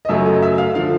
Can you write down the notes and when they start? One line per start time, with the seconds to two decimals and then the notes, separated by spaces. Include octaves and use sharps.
0.05 D#5
0.09 F#2 C#3 F#3 A3 E5
0.26 D#5
0.42 E5
0.58 F5
0.75 D3 F3 F5